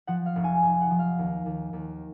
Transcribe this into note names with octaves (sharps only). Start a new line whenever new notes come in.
F3 F#5
F5
F1
G#5
F1 G#5
F#5
F3
F5
D#2
D#2
D#2